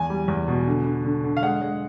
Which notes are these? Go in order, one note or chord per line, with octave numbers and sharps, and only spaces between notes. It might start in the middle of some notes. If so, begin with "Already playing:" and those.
Already playing: E2 G#5
G3
E2
B2
D3
D3
D3
D3
F5
G#3 F#5
G#3